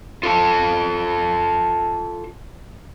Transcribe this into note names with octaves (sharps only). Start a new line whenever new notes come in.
F4 A4 G5 A5